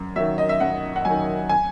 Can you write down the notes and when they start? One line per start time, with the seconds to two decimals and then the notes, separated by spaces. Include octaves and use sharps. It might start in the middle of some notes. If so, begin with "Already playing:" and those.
Already playing: F#2
0.16 D#3 F#3 E5
0.38 D#5
0.49 E5
0.60 F#2 F#5
0.96 F#5
1.05 D#3 F#3 G#5
1.49 G#5